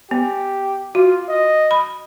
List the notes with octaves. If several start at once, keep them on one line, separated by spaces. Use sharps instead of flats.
B3 G4
F4 F#4
D#5
B5